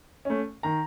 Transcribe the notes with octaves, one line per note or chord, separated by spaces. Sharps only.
A3 C#4
D#3 A#5